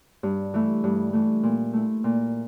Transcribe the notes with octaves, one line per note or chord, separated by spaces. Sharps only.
G2
E3 A3
G2
E3 A3
A#2
A3 E4
A#2